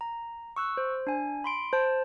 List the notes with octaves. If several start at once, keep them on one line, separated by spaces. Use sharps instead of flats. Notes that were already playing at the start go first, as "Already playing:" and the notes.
A#5
C#6 E6 F#6
C5
D4 G#5
B5 C6 D7
C5 A5